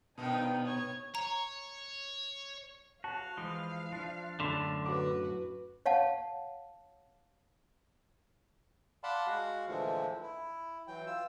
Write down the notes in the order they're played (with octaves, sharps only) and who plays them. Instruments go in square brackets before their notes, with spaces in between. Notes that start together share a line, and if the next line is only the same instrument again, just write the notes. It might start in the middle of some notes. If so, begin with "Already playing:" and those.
[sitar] G2 D#3 F3 [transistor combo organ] B2 B3 D#6 [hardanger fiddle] D#4 G5
[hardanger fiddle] C#5
[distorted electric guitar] C#5 [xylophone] A#5
[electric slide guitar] F#4 [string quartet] F5 [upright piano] A5
[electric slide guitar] E3 F3 G#3
F3 D4
[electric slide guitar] F#2 A2 A5 [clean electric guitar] D3 [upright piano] B5 C6 B6
[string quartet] F#4 B4 [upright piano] D6
[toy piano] C#5 F5 F#5 A5
[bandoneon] D5 F5 F#5 A5 B5 C6
G#3 F#4 F5 F#5
A#2 D3 E3 F3 G#3 A3
E4
E3 F#3 G5
F4 E6